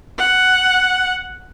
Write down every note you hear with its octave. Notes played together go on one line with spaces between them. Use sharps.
F#5